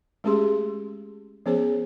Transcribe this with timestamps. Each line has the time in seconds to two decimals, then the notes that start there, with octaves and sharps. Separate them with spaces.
0.24 G#3 A3 C#4 G4 G#4 C6
1.46 F3 B3 C#4 G#4 C5 C#5